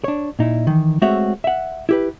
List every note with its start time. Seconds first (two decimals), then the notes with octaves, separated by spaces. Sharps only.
0.04 D4 C#5
0.39 A#2 D#4 E4
0.67 D#3 E3
1.02 G#3 A3 C4 F#4 C#5 E5
1.44 E5 F#5
1.89 E4 G4 B4